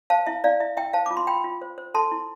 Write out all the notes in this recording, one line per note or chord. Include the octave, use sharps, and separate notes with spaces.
C5 F5 A5
E4 E5
E4 D5 F5
E4 E5
E4 E5 G5
C5 F5 A5
F4 D6
C6
F4 G5 B5
F4
C5
C5
A4 A5 C6
E4